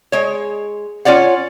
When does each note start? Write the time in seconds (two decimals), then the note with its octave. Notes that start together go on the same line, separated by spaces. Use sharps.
0.12 G#3 C#5
1.05 C#4 F4 C#5 D5 F#5